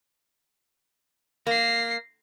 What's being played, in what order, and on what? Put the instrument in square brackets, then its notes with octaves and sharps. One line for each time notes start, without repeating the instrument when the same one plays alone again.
[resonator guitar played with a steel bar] A#3 [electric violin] A#6 C7